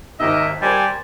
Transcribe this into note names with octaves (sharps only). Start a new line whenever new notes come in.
G#1 D#2 D#3 G4 A#4 D#5 E5
G3 G4 A#4 C5 G#5 A5